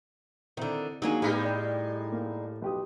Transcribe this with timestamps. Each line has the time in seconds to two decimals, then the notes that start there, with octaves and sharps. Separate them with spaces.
0.57 D3 D#3 C4 E4
1.02 D#3 F#3 A#3 D4 D#4 G#4
1.22 A2 G3 G#3 B3 D#4 G#4
1.43 D5
2.12 A#3
2.62 B1 G4 D#6